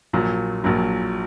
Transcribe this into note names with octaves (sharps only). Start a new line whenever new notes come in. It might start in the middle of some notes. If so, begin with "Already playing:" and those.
A#1 A#2 F#3
A#1 A#2 F#3